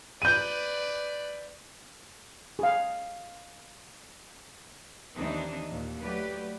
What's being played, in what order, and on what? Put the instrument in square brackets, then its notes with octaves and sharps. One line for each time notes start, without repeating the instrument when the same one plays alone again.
[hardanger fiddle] B4 D5 [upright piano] G6 D#7
[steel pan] G#4 F5
[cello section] D#2 E3 C4 D4 D#4 D#5
D#2 A#2
F#3 A3 G4 B4 D5